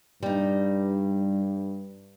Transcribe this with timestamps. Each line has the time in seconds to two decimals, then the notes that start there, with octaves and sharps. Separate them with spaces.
0.23 G2 G3 D#4